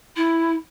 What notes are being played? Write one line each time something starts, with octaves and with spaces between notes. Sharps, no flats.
E4